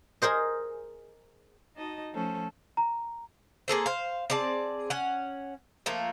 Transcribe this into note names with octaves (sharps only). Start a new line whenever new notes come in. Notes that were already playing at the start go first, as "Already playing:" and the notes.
G#4 A#4 C5 D#5
D#4 F#4 D#5 A5
F3 A3 C#4 A4 C5
A#5
A#3 G#4 A4 C5
C5 F5
C4 G#4 D5 A5
C#4 F#5
F3 A3 A#3